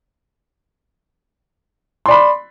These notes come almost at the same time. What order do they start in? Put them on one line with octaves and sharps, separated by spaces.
C6 D5 B5